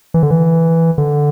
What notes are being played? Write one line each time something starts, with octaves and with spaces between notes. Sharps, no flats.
E3
D3
E3
D3